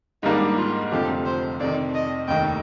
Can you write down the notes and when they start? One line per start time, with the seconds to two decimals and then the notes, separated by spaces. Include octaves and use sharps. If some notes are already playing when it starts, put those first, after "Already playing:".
0.23 G#2 D#3 G3 A#3 D4 D#4
0.58 F4
0.92 F1 F2 D3 F3 G4
1.26 C5
1.60 F2 C3 D#3 D5
1.95 D#5
2.28 F1 D#2 D#3 G5